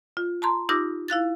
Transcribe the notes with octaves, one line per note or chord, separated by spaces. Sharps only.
F4
A5 A#5 C6
D#4 F4 G4 D6 E6 A#6
E4 F5 F#6 A6